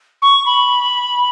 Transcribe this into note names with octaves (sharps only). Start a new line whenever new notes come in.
C#6
B5